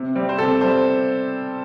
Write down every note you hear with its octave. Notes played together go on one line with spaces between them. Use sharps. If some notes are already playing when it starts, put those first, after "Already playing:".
Already playing: C3
G3 C4
C5
C3 A4
G3 C4 C5